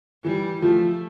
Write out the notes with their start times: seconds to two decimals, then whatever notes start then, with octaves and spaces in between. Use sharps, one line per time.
0.24 E3 G3
0.62 F3 A3